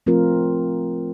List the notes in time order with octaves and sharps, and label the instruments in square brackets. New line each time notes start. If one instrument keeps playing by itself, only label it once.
[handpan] F3 A3 C4 F4 A#4